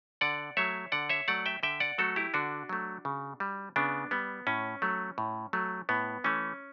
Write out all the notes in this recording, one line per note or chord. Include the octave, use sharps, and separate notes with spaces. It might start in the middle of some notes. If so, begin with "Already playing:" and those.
D3 D5 F#5
F#3 A3 C#5 E5
D3 D5 F#5
C#5 E5
F#3 A3 D5 F#5
E5 G5
D3 E5 G5
D5 F#5
F#3 A3 F#4 A4
E4 G4
D3 D4 F#4
F#3 A3
C#3
G3
C#3 B3 D4
G3 B3
A2 C#4
F#3 A3
A2
F#3 A3
A2 B3
E3 A3 C#4